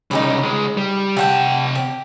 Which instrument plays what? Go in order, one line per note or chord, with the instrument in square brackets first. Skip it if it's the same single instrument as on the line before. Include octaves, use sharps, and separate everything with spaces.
[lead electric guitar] C2 C#3 [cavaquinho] D#4 G#4 B5
[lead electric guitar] C#2 G#3
G3
[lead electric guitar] C3 A5 [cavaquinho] G4 F#5 G5
[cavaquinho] G4